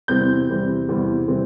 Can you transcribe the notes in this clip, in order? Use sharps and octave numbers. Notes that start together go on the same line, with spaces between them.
E2 C3 E3 G3 C4 G6
E2 C3 E3 G3 C4
E2 C3 E3 G3 C4
C3 E3 G3 C4